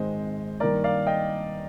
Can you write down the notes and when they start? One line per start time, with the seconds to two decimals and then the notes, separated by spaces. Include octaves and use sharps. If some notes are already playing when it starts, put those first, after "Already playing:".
Already playing: G#1 G#2 D#3 G#3 C4 C5 D#5
0.60 G2 D#3 A#3 A#4 D5
0.84 D5 F5
1.07 D#5 G5